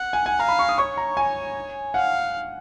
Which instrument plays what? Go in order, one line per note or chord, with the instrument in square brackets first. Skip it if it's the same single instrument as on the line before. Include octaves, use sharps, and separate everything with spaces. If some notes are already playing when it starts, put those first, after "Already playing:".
Already playing: [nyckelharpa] F#5
[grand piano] G#5
G#5
[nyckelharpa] F5 [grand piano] A#5
[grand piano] B5
C#6
D#6
[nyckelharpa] C#5 [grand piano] C#6
[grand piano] A#5
G#5
[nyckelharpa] F5 [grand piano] F#5